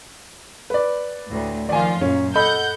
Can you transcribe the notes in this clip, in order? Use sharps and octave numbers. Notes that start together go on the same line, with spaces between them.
B4 D5
D2 A2
D#3 F3 F4 D5 G#5
F#2 A#2 C#4
A4 D#5 F#5 B5 G6